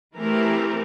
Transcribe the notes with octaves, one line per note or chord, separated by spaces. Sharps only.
E3 A3 C4 G4 A#4